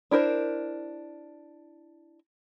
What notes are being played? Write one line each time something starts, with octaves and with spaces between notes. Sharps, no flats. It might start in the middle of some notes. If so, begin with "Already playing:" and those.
D4 E4 A#4 C5